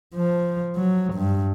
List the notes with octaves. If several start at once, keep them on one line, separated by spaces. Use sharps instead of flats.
F3
F#3
G2